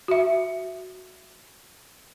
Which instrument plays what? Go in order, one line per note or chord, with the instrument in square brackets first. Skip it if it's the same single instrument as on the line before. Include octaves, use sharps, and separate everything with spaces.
[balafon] F#4 E5